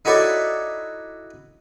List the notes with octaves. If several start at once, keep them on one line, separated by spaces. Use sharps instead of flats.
D#4 E4 F#4 A4 C#5 D5